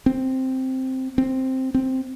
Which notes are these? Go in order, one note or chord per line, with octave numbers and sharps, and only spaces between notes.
C4
C4
C4